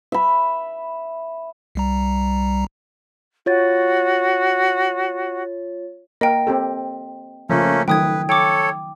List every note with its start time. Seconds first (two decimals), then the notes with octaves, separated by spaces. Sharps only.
0.12 E5 B5
1.75 C2 G3 A#5
3.46 F4 F#4 C#5 A6
6.21 A#3 A#4 D#5 G5
6.47 C4 G4 A4
7.50 C#3 F3 A3 A#3 C#4
7.88 D#3 F#3 A3 B4 G5 D#6 G#6
8.29 A4 C#5 G5 D6